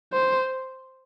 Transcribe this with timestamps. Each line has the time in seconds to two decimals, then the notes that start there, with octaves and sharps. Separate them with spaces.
0.13 C5